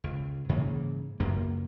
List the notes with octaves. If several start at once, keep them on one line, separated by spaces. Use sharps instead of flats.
C#2
G#2 C#3 E3 A#3
C#2 F#2 A#3